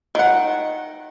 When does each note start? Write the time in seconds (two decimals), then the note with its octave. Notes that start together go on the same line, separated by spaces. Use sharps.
0.15 D#3 F#5